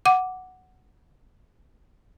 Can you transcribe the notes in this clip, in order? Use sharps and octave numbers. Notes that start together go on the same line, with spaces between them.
F#5 D6